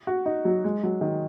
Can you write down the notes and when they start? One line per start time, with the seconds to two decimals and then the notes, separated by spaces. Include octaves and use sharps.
0.07 F#4
0.26 D#4
0.45 F#3
0.64 G#3
0.83 F#3
1.01 D#3